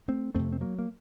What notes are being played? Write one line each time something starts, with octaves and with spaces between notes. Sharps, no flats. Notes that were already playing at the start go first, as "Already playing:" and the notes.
A3 C4
F2 C3 A3 C4
C4
F#3 A#3
A#3